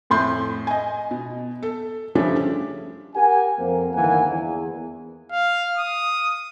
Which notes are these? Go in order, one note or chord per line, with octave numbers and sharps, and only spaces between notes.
F2 A2 C6 G6
D#5 G#5
B2
A4
C#3 F3 G3 A3 C#4 D4
G4 A#4 F#5 G#5
F2 A#3 C4
G1 D#2 E3 A#3 F#5 G#5
E2
F5
D#6